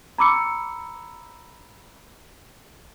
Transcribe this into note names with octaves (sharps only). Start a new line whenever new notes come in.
A#5 B5 D6 E6 C#7